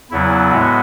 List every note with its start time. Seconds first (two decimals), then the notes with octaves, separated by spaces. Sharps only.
0.11 E2 C#3 F#3 B3 E4
0.51 A2 G#3 B3 F#4